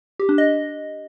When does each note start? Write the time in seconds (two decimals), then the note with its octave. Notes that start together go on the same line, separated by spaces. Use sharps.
0.19 G4
0.29 D4
0.38 D#5